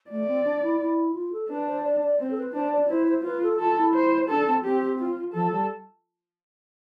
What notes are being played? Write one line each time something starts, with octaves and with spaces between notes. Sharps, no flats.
A3 D5
C4
D4
E4
E4
F4
A4
D4 B4
C5
D5
D5
C4 C5
A4
B4
D4 C5
D5
E4 C5
C5
F4 B4
A4
F4 A4
E4
C5
D4 A4
C4
C4 G4
F4
F3 A4
G3